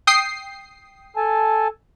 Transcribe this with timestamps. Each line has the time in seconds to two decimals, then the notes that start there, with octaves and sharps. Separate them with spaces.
0.07 G5 D#6 C7
1.17 A4 G#5 A5